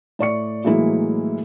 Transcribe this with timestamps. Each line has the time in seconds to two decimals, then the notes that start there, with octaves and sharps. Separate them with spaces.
0.19 A2 D5 C#6 C#7
0.65 A2 E3 F#3 G#3 A#3 E4